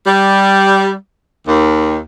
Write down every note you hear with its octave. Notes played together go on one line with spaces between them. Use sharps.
G3
D#2